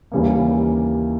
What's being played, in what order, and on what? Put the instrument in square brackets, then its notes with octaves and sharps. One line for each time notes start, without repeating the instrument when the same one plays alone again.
[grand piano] D#2 C#3 E3 G3 A#3